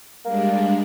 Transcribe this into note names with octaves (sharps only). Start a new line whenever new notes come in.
G3 G#3 A#3 D4